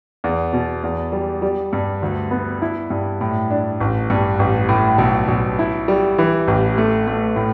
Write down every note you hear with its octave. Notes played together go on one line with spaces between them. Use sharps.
E2
B2
E2
G3
G3
G2
D2
B3
E4
G2
A2
D4
A1
G2
A1
A2
B1
B1
E4
G3
E3
A1
A3
A3
A2